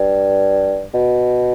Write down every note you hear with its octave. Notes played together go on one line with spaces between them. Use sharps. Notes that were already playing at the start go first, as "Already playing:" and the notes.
Already playing: G2
B2